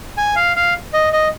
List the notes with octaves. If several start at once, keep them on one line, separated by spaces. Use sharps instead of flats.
G#5
F5
F5
D#5
D#5